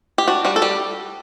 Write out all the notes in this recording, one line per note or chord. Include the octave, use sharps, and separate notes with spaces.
G4
D4 F#4
G3 F#4
A4
G3 G4